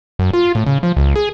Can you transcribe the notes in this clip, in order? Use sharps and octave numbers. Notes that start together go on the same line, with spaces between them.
F#2
F4
A2
C#3
F3
C#2
G#4